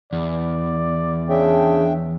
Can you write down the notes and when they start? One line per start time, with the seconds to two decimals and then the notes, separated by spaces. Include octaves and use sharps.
0.13 E2 D5
1.29 C#3 D4 E5 G5